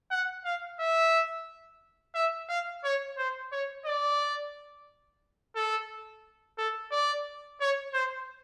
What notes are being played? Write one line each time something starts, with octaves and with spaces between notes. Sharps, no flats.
F#5
F5
E5
E5
F5
C#5
C5
C#5
D5
A4
A4
D5
C#5
C5